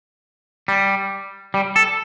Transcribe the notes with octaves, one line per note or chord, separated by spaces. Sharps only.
G3
G3
A4